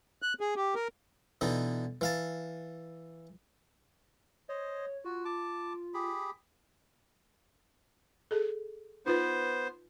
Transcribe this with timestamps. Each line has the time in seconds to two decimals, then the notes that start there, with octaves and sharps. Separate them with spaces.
0.22 F#6
0.41 G#4
0.56 G4
0.75 A#4
1.41 B2 D3 E3 D#4
2.01 E3 F5 A5
4.49 C5 C#5 D#5
5.05 F4 F#4
5.25 A5 D6
5.94 G4 G#4 B5
8.31 G#4 A4
9.06 B3 D#4 F4 B4 C5